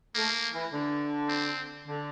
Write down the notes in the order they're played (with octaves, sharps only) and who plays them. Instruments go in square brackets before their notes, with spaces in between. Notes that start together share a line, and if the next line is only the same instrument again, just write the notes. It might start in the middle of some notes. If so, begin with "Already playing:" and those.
[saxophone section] A3 [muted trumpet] A#3
[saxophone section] E3
D3
[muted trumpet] C4
[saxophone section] D3